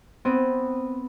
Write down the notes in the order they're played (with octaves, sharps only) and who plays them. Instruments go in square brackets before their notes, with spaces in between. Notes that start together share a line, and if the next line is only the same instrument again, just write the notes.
[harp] B3 C4